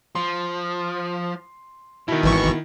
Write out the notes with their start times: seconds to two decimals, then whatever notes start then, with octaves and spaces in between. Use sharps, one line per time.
0.15 F3 C6
2.08 B2 D#3 B3 E4
2.23 G#1 E3 C#6